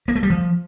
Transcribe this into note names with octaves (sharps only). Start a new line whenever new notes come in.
A#3
A3
G3
F3